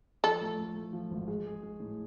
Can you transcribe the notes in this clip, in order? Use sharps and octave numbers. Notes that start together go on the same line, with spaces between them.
F3 A4
A3
A3
A3
F3
G#1
G#3
G#4
G#3
A2